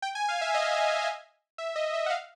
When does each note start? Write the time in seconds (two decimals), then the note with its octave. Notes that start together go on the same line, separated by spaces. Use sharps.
0.02 G5
0.15 G#5
0.28 F5
0.41 E5
0.55 D#5
1.58 E5
1.76 D#5
1.94 E5
2.06 F#5
2.10 F5